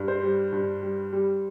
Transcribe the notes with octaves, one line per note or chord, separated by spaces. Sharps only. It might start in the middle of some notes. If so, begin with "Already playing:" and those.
Already playing: G2
C5
G3
G2
G3
G3